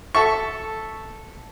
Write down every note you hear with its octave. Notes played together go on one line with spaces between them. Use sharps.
A4 E5 C#6